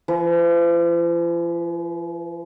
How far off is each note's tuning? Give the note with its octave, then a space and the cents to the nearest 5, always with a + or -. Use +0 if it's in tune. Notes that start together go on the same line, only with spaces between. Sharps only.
F3 -45 B4 +0